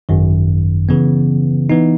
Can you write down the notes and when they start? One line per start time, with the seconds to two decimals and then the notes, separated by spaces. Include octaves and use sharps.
0.09 G#1 F#2 D#3
0.89 C#3 E3 B3
1.70 E3 B3 D#4